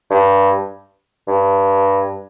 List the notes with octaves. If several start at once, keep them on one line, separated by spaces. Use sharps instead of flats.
G2
G2